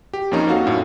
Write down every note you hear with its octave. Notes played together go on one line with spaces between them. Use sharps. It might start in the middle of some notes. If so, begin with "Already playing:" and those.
G4
F2 A#3 C#4 D#4
F#4 A4 F5
F#2 A2